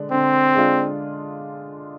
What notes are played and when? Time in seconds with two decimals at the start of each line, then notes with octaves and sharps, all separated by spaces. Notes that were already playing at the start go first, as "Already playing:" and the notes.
Already playing: D3 G#3 D4
0.11 D3 C4
0.55 G#3 D4 F4